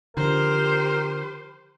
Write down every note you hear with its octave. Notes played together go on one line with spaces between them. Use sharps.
D3 F3 G4 A#4 C5